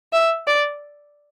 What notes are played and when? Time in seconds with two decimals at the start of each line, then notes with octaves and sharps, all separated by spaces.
0.13 E5
0.47 D5